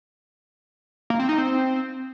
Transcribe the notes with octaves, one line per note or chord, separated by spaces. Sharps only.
A#3
C4
D#4
C4